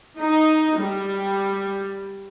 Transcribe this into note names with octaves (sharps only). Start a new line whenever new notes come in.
D#4
G3